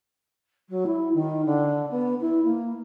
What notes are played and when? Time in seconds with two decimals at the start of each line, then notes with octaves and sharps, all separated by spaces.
0.69 F#3
0.86 E4
1.13 D#3
1.45 D3
1.90 B3
2.20 E4
2.44 A#3